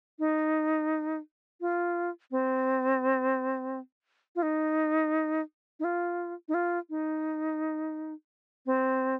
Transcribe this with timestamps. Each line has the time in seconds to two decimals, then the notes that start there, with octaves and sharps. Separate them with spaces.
0.19 D#4
1.61 F4
2.31 C4
4.36 F4
4.42 D#4
5.80 D#4
5.84 F4
6.48 D#4
6.54 F4
6.90 D#4
8.66 C4